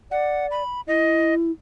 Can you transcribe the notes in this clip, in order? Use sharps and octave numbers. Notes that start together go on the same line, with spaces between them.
D5 F#5
B5
E4 D#5